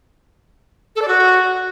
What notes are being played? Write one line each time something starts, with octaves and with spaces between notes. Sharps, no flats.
A4
D5
F#4